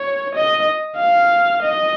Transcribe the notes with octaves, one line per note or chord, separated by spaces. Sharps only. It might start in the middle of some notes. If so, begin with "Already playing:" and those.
Already playing: C#5
D#5
F5
D#5